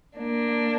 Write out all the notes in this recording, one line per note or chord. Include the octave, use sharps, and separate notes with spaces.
A#3 D4